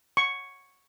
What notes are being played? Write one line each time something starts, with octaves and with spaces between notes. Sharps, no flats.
C#6